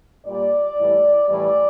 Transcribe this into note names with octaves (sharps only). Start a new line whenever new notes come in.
A#2 G3 D5
A2 E3 G3
A2 E3 G3 D5